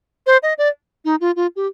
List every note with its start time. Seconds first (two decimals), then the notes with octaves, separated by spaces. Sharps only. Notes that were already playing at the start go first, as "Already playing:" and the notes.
0.27 C5
0.43 D#5
0.58 D5
1.05 D#4
1.21 F4
1.36 F4
1.56 G4